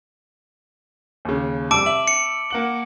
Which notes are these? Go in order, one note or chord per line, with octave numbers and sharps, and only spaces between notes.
D#2 C#3
F1 G3 A5 D6 E6 D7
E5 F#7
C#7
A#3 F#5 F#7